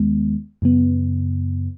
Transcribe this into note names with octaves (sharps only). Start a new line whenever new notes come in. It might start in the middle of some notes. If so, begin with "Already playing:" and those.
Already playing: D#2 D#3 G#3 B3
F#2 C#3 B3